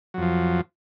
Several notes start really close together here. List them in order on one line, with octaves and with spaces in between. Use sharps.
F#3 F2 F3